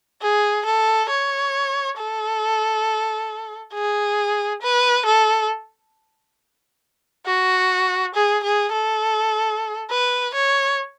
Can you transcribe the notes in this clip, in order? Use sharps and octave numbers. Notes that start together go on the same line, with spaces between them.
G#4
A4
C#5
A4
G#4
B4
A4
F#4
G#4
G#4
A4
B4
C#5